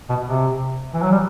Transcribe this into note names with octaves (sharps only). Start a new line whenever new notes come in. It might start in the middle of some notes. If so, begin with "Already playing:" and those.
B2
C3
E3
F#3
G3